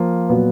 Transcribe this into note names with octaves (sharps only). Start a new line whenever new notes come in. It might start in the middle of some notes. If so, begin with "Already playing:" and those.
Already playing: F3 A#3 F4
A#2 F#3 B3 F#4